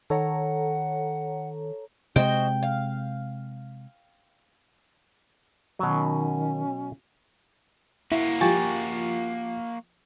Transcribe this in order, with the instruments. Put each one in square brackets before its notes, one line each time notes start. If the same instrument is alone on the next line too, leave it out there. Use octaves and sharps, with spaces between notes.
[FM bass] D#3 [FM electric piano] A4 C#5 A#5 [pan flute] F#5
[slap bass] C3 G#3 [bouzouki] F#4 C5 D#5 [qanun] G5
[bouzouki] F5
[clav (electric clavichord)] B2 F#3 [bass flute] D#3 [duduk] C#4
[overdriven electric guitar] A#3 F#4 [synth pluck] E4
[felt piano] F3 G4 [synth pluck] G#5 C#6 A6